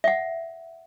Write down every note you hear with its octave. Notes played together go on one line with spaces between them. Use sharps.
E5 F#5